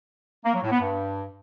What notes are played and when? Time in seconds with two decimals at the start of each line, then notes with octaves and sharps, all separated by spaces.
0.45 A#3
0.54 F#3
0.63 A2
0.71 B3
0.80 G2